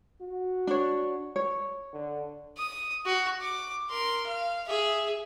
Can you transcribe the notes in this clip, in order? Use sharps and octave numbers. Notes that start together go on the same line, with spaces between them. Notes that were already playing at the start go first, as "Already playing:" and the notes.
F#4
D4 C#5
C#5
D3
D#6
F#4
D6
A#4 C6
F5
G#4 E5